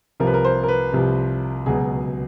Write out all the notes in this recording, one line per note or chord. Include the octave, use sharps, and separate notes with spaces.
C2 C3 F3 A#4
B4
A#4
C5
A#4
B4
C2 C3 F3
C#2 B2 F#3 G#4